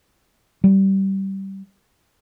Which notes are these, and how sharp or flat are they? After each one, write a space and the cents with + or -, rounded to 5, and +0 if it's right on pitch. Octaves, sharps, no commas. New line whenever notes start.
G3 -20